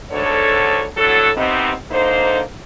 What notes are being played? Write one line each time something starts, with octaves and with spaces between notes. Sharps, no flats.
D2 G#2 D3 A4 C#5
A2 D3 F#3 F#4 A4
C3 B3 C4 D#4
D3 A#3 D#4 C5